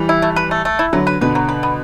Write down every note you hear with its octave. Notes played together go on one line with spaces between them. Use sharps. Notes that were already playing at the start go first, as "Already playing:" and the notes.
Already playing: E3 G3
E4
A3
B4
A3
A3
E4
D3 F#3 B4
B4
B2 D3 B4
F#3
B4
B3